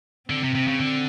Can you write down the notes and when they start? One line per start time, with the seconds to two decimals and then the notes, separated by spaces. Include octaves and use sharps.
0.30 D3 C4
0.43 C3
0.55 C3
0.68 C#3
0.79 D3